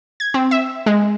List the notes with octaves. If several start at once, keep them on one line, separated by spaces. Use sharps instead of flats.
G#6
C4
E5
G#3